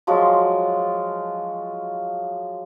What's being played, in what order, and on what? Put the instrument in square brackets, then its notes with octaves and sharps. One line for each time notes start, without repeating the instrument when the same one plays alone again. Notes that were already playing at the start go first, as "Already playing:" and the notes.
[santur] F3 F#3 G#3 F4